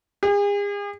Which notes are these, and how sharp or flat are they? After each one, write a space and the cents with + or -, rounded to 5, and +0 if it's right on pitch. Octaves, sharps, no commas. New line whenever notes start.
G#4 -40